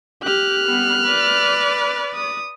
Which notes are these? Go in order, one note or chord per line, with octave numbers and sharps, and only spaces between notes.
G4 F6 F#6
G3 B3
B4 D5
D#6